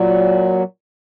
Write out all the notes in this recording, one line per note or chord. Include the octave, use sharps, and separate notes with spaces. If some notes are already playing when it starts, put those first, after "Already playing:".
Already playing: A#2 F#3